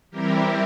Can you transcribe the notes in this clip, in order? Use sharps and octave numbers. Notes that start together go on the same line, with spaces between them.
E3 G3 C4 E4 G4 A#4